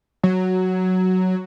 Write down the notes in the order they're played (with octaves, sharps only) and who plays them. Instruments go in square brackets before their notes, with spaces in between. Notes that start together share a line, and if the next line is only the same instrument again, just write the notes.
[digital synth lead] F#3